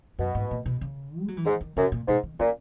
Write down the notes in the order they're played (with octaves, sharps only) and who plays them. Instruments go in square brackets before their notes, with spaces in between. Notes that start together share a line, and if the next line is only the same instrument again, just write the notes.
[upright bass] F#2 [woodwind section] B2
[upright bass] G#2
A#2
B2
C#3
G#3
F#3
E3
[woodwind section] G#2 [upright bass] D#3
[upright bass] D#3
[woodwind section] F#2 [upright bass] C#3
[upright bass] A#2
[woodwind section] G#2 [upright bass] B2
[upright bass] D#3
[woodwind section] A#2 [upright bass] C#4